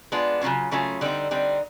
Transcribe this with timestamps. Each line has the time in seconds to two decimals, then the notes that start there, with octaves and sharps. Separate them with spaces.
0.12 G#3 B3 D4 F4
0.41 C#3 F#3 A3 C#4 F4
0.71 C#3 F#3 A3 C#4 F4
1.01 D3 G3 C4 D#4
1.31 D3 G3 C4 D#4